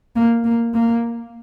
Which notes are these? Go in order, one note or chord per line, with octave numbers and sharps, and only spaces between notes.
A#3
A#3
A#3